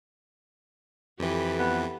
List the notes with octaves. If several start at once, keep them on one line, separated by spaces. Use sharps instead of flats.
F2 E3 G4 A4 B4
B3